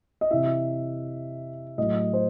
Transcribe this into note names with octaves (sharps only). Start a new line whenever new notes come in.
D#5
C3 E3 E5
A2 F#3 D#5
C5